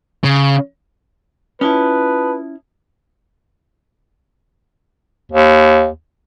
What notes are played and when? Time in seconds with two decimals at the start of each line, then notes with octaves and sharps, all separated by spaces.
0.24 C#3
1.61 C#4 E4 F4 B4 A5 D#6
5.32 D#2